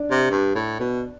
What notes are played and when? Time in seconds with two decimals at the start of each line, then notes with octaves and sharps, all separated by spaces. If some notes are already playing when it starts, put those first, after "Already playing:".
Already playing: D4
0.10 C3
0.30 G2
0.55 A2
0.80 B2